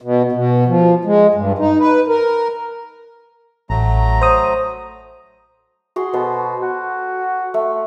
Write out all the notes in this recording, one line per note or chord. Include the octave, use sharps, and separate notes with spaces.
B2
B2
F3
G#3
G2
D#4
B4
A#4
A1 F#3 A3 A#5
C5 D#6
F#4 G#4 C6
B2 A4 C5
F#4
A3